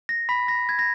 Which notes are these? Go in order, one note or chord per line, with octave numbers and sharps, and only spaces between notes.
A#6
B5 B6
A#6
G#6
A#6